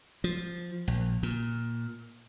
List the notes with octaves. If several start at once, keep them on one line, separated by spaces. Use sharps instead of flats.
F3
A#1
A#2